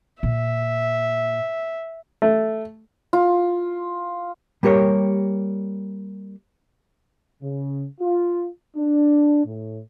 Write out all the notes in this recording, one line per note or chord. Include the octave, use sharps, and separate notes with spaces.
A#2 E5
A3
F4
G3 A#3 G4 A#4 C#5
C#3
F4
D4
A2